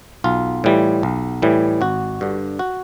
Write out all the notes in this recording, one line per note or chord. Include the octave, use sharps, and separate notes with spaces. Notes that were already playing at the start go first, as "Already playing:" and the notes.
B1 F4
A2 E3 G3
B1
A2 E3 G3
G#1 F#4
G2 D3
F#4